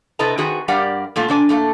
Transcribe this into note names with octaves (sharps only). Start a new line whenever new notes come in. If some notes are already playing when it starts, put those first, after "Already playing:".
C3 E4 A4 B4 D#5 A#5
D#3 C4 F#4 G#4 B4
G2 G3 G4 A#4 D5 F#5
A#2 A3 F4
C3 D4 C#5 G#5
A2 A3 A#3